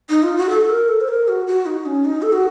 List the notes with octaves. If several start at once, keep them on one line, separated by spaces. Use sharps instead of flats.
D#4
F4
F#4
A4
A#4
A4
C5
A#4
F#4
F#4
D#4
C#4
D#4
A4
F#4